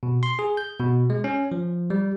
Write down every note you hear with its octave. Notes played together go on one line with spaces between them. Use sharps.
B2
C6
G#4
G6
B2
G#3
C#4
F3
G3